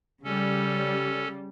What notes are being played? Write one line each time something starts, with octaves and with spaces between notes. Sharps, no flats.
C#3 G3 C#4 A4